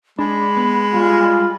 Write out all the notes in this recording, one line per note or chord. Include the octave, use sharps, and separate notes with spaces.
G#3 D4 B5
B3
G3 F4